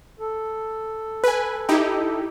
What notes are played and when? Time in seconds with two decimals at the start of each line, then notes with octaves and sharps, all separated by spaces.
0.20 A4
1.24 B4 G#5
1.69 D#4 E4 G4